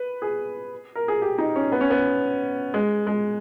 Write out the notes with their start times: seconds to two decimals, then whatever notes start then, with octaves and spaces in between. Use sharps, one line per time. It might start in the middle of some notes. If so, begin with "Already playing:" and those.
Already playing: B4
0.22 G#4
0.95 A#4
1.08 G#4
1.22 G4
1.38 D#4
1.56 C#4
1.72 B3
1.81 C#4
1.90 B3
2.74 G#3
3.07 G#3